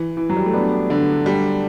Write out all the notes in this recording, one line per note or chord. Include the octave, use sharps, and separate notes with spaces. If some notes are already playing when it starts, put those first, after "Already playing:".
Already playing: E3
E3
F#3
G3
A3
B3 D4
D3
G3